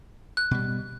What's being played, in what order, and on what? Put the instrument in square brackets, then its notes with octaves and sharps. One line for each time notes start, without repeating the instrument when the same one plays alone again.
[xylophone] F#6
[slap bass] B2 G3